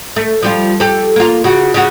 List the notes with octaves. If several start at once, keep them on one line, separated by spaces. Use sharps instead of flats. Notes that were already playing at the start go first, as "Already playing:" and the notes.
A3
F3 G3 F4
G4 A4
A#3 F4
C#3 F#4
C#3 F#4